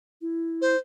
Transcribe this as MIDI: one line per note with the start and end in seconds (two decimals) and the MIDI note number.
0.21 0.75 64
0.62 0.78 72